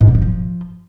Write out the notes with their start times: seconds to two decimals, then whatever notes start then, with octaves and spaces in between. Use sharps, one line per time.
0.01 G#2
0.08 G3
0.15 G#2
0.22 F3